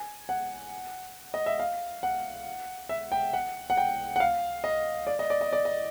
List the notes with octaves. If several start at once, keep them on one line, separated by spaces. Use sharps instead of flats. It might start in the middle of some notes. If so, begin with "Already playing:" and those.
Already playing: G#5
F#5
D#5
E5
F5
F#5
E5
G5
F#5
F#5
G5
F#5
F5
D#5
D5
D#5
D5
D#5
D5
D#5